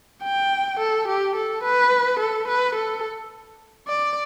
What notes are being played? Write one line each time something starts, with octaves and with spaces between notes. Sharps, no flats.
G5
A4
G4
A4
B4
A4
B4
A4
D5